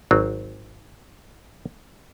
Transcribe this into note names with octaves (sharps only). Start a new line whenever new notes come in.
G#1 F#3 C4